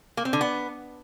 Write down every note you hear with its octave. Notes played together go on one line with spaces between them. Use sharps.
A#3
C4
D3
B3